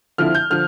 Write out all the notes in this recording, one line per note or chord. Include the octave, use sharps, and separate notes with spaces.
D3 F3 C4 E4 F6
G6
D3 F3 F6